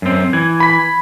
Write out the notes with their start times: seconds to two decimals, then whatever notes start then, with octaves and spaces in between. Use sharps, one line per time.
0.02 F#2 C4
0.33 E3 G#6
0.60 B5 B6